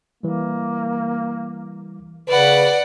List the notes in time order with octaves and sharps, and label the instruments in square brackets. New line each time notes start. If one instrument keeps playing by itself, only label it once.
[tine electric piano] E3 G3 [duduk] A#3
[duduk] C#3 [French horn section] B4 [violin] D5 F#5